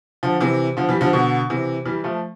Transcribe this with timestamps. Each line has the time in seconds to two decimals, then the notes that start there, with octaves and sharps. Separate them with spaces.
0.23 D3 F3
0.41 C3 E3
0.77 D3 F3
0.89 E3 G3
1.01 D3 F3
1.13 B2 D3
1.50 C3 E3
1.86 E3 G3
2.04 F3 A3